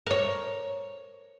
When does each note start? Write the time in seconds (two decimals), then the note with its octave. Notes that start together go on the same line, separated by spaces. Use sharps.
0.07 A#4 C#5